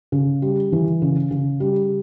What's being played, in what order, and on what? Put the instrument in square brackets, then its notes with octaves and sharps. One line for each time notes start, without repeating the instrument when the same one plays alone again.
[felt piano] C#3
G3
E3
C#3
C#3
G3